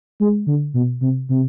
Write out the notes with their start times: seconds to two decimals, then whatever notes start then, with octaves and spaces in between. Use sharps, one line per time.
0.20 G#3
0.47 D3
0.74 B2
1.01 C3
1.29 C3